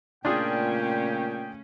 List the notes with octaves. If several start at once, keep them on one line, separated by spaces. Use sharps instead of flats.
A#2 C#3 A3 C#4 D4 F4 G#4 G5